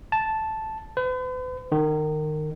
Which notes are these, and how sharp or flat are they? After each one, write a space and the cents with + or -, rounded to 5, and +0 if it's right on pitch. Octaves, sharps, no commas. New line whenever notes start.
A5 -5
B4 +45
D#3 -25